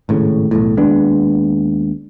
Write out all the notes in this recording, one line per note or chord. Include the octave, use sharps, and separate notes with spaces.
G#1 A2 C#3
B1 E2 A2
D#2 G#3 B3 D4